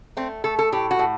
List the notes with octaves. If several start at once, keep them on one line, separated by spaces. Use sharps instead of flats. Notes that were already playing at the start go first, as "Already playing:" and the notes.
A3 C4
A3 A4
A4
A2 G4
F#4
A2